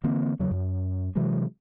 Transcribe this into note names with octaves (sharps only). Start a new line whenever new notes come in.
D3 E3 A#3 C4
E2 C#3 F#3
F#2
C3 E3 F#3 G#3